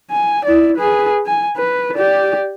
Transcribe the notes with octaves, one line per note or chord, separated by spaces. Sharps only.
G#5
E4 D5
G#4 B4
G#5
B4
G4 D5